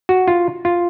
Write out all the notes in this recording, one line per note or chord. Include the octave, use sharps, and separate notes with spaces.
F#4
F4
F4